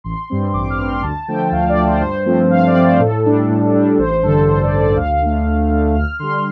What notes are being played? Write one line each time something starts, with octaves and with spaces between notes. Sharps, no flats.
A1 C6
G2 G3 C4
A1 D6
F6
G2 G3 C4
C6
D2 A5
D3 F3 A3 G5
D2 F5
D5
D3 F3 A3
C5
G2 C5
F3 A3 C4
G2 F5
D5
F3 A3 C4
C5
A2 A4
G3 D4
A2
G3 D4
A1 C5
G2 D3 A4
A1 C5
D5
G2 D3
D5
D2 F5
D3 A3
D2
D3 A3
D2 F6
D3 G3 C6